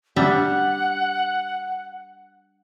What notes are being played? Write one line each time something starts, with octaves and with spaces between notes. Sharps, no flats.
G3 D4 E5 F#5